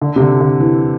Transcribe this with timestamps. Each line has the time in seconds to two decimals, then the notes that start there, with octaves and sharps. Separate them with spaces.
0.01 D3
0.16 C3
0.20 D3
0.41 D3
0.60 E3